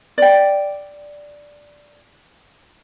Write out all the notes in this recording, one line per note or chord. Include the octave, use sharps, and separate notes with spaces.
D5 G5